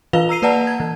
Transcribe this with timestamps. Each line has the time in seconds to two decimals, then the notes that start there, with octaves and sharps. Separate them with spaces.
0.13 E3 F4 B4 F5 F7 G7
0.29 A#5 E6 C7 D#7
0.42 A#3 B4 D5 F#5 A5 A#5
0.67 G#6
0.80 E3